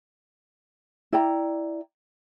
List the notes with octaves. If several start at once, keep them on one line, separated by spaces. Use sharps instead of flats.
E4 D5 G5 A#5